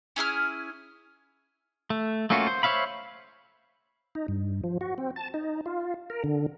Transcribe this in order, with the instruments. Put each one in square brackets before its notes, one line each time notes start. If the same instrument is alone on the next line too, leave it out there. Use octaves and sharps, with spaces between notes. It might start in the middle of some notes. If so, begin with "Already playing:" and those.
[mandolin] C#4 E4 G#4 F6
[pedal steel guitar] A3
A3 A#3 C#4 F4 F#4
C5
C5 C#5 E5 F5 B5
[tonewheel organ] D#4
G2
F3
F#4
C4
A5
D#4
F4
A#4
D3